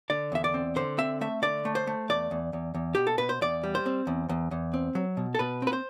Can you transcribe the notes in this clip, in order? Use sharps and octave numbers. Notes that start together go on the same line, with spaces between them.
D3 D5
E2 E5
D5
C4
D3 C5
C4 E5
A3 E5
D3 D5
A3
C5
A3
E2 D5
E2
E2
E2
B2 G4
A4
B2 B4
C5
E2 D5
G3
C5
C4
E2
E2
E2
C4
F#3
B2
A4
B2 B4
C4 B4
C5